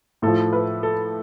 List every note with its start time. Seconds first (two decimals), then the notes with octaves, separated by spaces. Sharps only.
0.22 A2 F3 A4
0.53 B4
0.83 A4